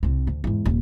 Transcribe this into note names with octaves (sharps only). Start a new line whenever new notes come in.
C2 C4
D2
E2 G#2
D#1 F3